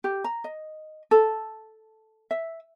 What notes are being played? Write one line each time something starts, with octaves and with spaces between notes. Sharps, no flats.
G4
A#5
D#5
A4
E5